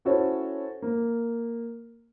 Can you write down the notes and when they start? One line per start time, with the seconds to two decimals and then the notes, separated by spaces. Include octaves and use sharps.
0.05 C#4 E4 F#4 A4 C5 C#5
0.82 A#3